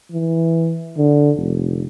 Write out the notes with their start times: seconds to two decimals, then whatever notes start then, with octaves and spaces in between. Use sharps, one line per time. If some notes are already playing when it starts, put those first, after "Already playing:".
0.12 E3
0.98 D3
1.36 F1